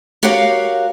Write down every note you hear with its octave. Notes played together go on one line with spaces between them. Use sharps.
F#4 G4 A#4 C#5 F5 F#5